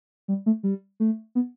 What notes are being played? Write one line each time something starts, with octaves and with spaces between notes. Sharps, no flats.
G3
A3
G3
A3
B3